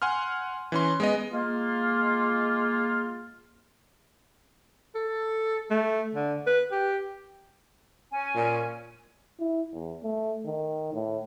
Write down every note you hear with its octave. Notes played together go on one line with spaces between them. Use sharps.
F#5 G#5 C6 F6
E3 C#4 C6
G#3 B3 D#5
G#3 A#3 F4
A4
A3
D3
B4
G4
C#4 G#5
A#2
E4
E2
A3
D#3
A2